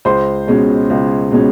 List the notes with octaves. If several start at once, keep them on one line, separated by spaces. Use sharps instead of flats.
C#2 C5 C6
B2 G#3 C#4
C#2
B2 G#3 C#4